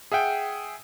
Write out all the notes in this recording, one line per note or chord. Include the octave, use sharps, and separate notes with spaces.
G#4 E5 F#5 G5